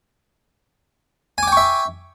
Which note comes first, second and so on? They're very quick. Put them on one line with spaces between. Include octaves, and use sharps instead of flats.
G#5 D6 G5 C#6 E5